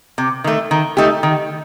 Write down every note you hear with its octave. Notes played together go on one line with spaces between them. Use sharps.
C3
D#3 A3
D#3
A3 D#4 G4
D#3